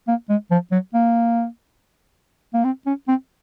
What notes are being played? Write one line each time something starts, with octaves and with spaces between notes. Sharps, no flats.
A#3
G#3
F3
F#3
A#3
A#3
C4
C#4
C4